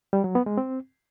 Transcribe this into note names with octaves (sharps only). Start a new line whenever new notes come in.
G3
F#3
B3
G#3
C4